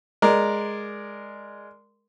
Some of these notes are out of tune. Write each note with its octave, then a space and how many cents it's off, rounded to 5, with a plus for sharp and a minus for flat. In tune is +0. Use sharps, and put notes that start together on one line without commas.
G#3 +0 A#4 +0 D5 +5